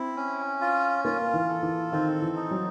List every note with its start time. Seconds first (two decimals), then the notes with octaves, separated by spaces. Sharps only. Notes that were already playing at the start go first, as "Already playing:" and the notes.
Already playing: C4 E4
0.17 C#4
0.61 F4
1.05 A#3 F4
1.34 E3
1.49 A4
1.63 E3
1.92 D#3 C4
2.22 E3
2.36 D#4
2.51 F#3